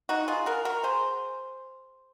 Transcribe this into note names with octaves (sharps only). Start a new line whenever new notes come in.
D#4 F#4
F4 G#4
F#4 A#4
F#4 A#4
G#4 C5